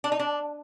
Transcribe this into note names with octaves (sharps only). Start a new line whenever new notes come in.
D4
D#4
D4